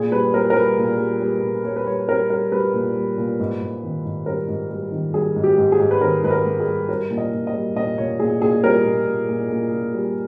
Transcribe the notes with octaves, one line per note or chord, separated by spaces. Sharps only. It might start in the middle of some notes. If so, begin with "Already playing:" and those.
Already playing: A#2 G#4
G3 B4
G3 A#4
A#4
G3 B4
A#2
G3
G3
A#2
G3 C#5
B4
G3 C#5
G3 A#4
G3 A#4
G3 B4
A#2
G3
A#2
G#2
G#2
D#3
G#2
G3 A#4
G#2
G3
D#3
G3 G#4
G#2
G4
G#2
G#4
G#2
B4
D#3 A#4
G#2 B4
A#4
G#2
G#4
G3
G3 A#4
A#2
D#5
A#2
D#5
G3
A#2 D#5
A#2 C#5
A#2 G#4
A#2 G#4
G3 A#4
A#2
A#2
A#2
A#2
A#2
G3